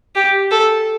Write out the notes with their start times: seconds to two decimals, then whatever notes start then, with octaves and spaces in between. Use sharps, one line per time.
0.15 G4
0.51 A4